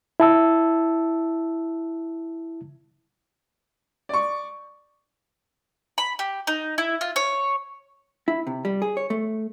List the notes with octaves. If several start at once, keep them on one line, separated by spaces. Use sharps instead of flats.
E4 A5 E6
D5 C#6
B5
G4
D#4
E4
F4
C#5
E4
C3
G3
G#4
C#5
A3